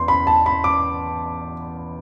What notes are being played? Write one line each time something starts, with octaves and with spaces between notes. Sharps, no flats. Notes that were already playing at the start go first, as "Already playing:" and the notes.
Already playing: E2 C6
B5
A5
B5
D6